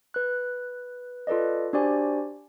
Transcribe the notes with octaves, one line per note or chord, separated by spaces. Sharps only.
B4 F#6
F4 A4 B4 D5 D#5
D4 F#4 G4 C5 D5 G#5